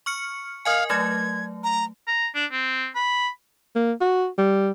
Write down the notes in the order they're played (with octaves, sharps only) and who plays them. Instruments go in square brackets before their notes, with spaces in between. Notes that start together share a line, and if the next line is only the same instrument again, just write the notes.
[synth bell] C#6 F6 C#7
[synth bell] A#4 D#5 G#5 [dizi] F5
[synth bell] F#3 A3 [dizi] G#6
[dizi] A#5
[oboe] A#5
D4
C4
B5
[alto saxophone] A#3
F#4
G3